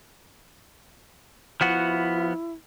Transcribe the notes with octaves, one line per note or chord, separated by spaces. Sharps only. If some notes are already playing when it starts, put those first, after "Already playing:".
F3 B3 E4 F#4